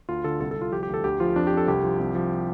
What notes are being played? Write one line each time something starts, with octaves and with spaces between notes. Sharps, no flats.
D2 F4
D3 A4
C2 A4
A4
C2
F4
F3 G4
G4
D2 A4
D2 G4
F3 F4
F2 D4
G4
F2 A4
C2 G4
F3
C2
F3